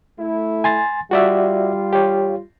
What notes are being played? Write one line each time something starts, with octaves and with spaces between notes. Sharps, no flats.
A3 E4
G#5 C6 A6
G3 F4 F#4 D5 E5
G4 C#5